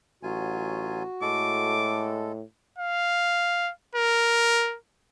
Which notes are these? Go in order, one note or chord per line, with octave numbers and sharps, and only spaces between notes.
A1 F#3 F4 F#4 G#5
A2 G#3 A4 D6
F5
A#4